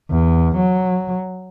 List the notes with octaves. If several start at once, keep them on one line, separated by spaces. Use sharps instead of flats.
E2
F#3